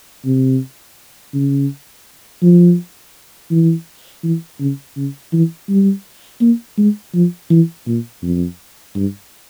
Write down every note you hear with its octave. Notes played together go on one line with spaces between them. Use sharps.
C3
C#3
F3
E3
E3
C#3
C#3
E3
G3
A#3
G#3
F3
E3
A#2
F2
G2